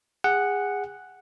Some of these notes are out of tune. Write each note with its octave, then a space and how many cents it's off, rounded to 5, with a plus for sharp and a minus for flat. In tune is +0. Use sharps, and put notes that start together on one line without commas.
G#4 -25 F#5 +0